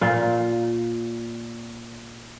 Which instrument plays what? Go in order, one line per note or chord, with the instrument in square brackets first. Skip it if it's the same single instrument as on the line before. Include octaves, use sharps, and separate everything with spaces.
[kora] A#2 F4